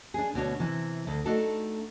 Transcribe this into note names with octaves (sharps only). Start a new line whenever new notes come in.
D4 G#4
D2 B2 D4 C#5
C3 E3
D2
A3 D4 D#4 F#4 A4